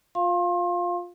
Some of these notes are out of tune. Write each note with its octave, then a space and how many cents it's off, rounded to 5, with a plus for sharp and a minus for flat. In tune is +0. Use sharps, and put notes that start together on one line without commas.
F4 +15 F5 +0 C6 +35